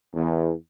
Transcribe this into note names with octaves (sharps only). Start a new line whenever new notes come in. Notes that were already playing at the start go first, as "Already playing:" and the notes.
E2